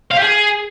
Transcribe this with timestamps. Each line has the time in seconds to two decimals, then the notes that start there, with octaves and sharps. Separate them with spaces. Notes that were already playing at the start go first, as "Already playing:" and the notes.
0.11 F5
0.17 G4
0.23 G#4